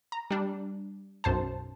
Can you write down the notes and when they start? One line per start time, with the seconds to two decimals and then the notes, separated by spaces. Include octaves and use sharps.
0.12 A#5
0.31 G3 D4
1.24 B1 F#2 C5 A5